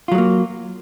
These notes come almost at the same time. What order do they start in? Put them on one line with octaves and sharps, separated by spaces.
F4 F#3 G#3 A#3